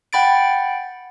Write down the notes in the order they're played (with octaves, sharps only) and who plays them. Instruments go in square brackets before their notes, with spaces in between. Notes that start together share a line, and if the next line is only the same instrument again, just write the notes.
[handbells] F#5 G5 B5 A6 D7